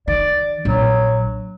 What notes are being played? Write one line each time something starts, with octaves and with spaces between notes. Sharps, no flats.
D#3 D5
A#1 F#3